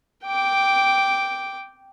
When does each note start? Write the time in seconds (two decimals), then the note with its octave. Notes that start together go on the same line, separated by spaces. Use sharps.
0.24 G5 D6